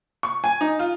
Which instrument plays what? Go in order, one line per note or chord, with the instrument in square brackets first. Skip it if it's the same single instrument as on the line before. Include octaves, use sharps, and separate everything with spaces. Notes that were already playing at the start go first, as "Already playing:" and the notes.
[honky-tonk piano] C#6
G#5
D#4
F4